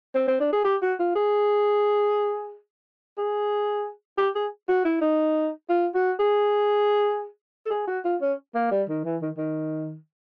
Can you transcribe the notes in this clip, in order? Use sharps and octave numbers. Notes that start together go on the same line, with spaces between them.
C4
C4
D4
G#4
G4
F#4
F4
G#4
G#4
G4
G#4
F#4
E4
D#4
F4
F#4
G#4
A4
G#4
F#4
F4
C#4
A#3
G3
D#3
E3
D#3
D#3